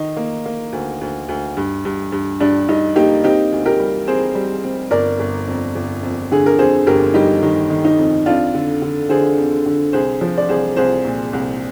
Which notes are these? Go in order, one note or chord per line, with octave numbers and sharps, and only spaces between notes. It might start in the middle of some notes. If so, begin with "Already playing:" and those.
Already playing: D#3 D#4
A#3
A#3
D2
D2
D2
G2
G2
G2
G2 D4
G2 D#4
A#3 D#4 G4
C4 D#4 G4
D2
G4 A#4
G3
C4 G#4 C5
G3
C4
G1 A#4 D5
G1
F2
G1
F2
D3 G#4
A#4
F2 G#4 C5
G1 G4 A#4
G3 D#4 G4
D#3 D#4
D#3
D#4
F2
F2 D4 F4
D3
D3
D3 G#4 C5
F2
D3
C2 G#4 C5
F3
D5
C2 G#4 C5
C2 G#4 C5
A#2
C2